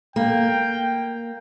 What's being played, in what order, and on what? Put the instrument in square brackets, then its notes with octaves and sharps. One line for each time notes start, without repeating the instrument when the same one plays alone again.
[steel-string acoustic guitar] A#3 [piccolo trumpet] G5